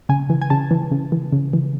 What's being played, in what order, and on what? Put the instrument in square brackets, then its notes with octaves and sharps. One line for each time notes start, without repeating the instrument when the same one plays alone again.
[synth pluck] C#3 G#5
E3
G#5
C#3 A5
E3
C#3
E3
C#3
E3